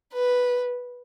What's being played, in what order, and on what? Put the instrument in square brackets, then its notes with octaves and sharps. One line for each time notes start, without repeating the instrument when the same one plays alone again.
[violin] B4